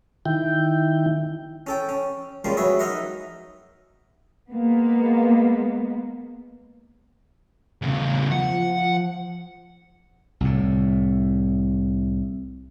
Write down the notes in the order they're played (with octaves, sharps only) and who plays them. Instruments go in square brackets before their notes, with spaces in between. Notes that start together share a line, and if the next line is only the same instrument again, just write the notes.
[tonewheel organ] D#3 E4 G5
[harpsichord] C#4 A4 G5
C#4
F3 G3 G#3 A#3 C#4
F#3 G#4 B4 C#5 E5
D#4 A#4 D#5 E5 F#5
[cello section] G#3 A#3 B3
[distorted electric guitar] E2 C#3
[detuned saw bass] F3 [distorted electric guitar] F#5
[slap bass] C2 A2